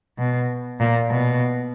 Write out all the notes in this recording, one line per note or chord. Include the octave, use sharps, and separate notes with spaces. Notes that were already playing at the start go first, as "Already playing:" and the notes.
B2
A#2
B2